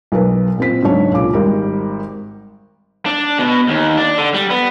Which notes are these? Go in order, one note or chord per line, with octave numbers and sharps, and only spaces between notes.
B1 A#4 B4
A#2 C4 B6
G#2 C#3 F#3 D4 C#5
C#2 A#2 D6
G#1 G3 A#4
D4
B2
D#2
D4
D3
G3
B3